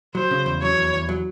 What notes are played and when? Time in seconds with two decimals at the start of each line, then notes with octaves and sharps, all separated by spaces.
0.14 F#3 C5
0.31 C#3
0.46 E2
0.62 F#3 C#5
0.77 E2
0.94 E2
1.09 F#3